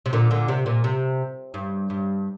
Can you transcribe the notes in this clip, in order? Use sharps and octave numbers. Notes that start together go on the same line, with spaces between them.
C3
A#2 D3
A#2 D3
C3
A#2
C3
G2
G2